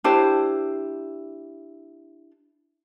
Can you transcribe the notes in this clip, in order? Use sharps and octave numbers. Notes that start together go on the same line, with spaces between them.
D4 E4 G4 C5